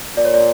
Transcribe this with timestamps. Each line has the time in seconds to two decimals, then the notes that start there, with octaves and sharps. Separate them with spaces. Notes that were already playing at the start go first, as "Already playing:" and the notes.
0.17 A#2 D5
0.25 C#5
0.34 D5